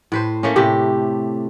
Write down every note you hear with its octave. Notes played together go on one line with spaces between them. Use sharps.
A2 B4 C5
A3 A#3 C#4
A2 C3 G4